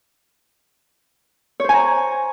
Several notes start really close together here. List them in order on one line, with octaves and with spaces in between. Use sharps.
C#5 C5 G#5 A#5